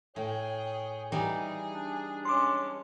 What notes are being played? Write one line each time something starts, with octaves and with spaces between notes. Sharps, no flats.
A2 G#4 C#5 G5
E3 G3 D#4 G#4
D4
G#3 C#4 C6 D6